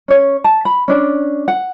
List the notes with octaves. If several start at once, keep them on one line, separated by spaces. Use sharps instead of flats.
C#4 C#5
A5
B5
C#4 D4 D5
F#5